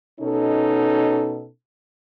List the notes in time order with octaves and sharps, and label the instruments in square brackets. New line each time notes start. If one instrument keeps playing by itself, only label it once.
[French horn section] B2 C#4 D#4 A4